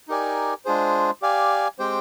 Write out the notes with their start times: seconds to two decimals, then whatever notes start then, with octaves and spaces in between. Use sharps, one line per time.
0.08 D#4 G4 A#4 D5 G#5
0.65 G#3 D4 F4 G#4 C5
1.22 G4 D5 F5 G#5
1.79 G#3 C4 G4 C5 G5